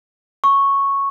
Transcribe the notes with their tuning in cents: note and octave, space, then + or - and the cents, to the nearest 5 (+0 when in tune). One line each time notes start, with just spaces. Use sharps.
C#6 -5